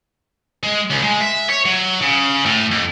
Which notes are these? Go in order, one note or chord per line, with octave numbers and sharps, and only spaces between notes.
G#3
C#2
G#3
E5
C#5
F#3
C#3
A2
F2